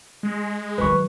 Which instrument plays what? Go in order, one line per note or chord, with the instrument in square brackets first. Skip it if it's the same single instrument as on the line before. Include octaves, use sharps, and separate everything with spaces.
[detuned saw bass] G#3
[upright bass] D#3 F#3 [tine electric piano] B4 C#6